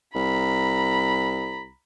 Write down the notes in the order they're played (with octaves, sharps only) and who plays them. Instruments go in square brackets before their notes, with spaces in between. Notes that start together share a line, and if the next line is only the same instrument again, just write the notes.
[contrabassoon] C2 [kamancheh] A#5 B5